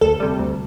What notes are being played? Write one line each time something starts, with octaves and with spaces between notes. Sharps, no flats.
D2 A4
C3 G3
D2